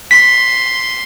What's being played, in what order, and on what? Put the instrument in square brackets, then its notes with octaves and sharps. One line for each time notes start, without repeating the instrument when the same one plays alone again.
[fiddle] C6 [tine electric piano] B6